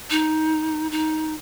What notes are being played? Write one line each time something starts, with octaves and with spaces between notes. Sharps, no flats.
D#4
D#4